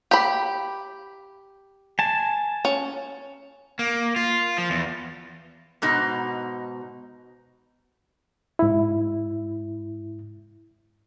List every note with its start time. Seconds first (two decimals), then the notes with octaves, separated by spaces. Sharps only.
0.11 G4 B5
1.99 G#5 A5
2.65 C#4
3.79 A#3
4.16 F4
4.58 F3
4.70 E2
5.82 G#2 B2 D#4
8.59 G#2 E4